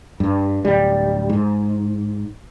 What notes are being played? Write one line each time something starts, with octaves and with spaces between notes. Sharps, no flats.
G2
D1 G3
G#2